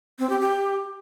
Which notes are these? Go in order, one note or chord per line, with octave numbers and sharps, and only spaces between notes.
C4
G4
G4